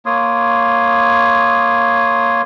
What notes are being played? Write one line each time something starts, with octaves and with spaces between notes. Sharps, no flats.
A#3 C#5 C6 D#6